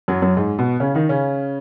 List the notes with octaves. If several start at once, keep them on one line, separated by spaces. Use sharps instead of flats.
F#2 F#3
F#2 F#3
G#2 G#3
B2 B3
C#3 C#4
D#3 D#4
C#3 C#4